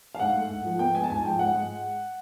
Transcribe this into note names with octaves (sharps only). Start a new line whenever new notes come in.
F5
G#2 F#5
A3
G#2
F3
B3 G5
G#3 G#5
A5
G#2 G#5
F3 G5
G#2 F#5
G#3